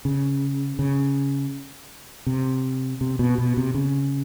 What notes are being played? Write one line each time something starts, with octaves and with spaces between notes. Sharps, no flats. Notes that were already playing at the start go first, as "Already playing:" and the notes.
C#3
C#3
C3
C3
B2
B2
C3
C#3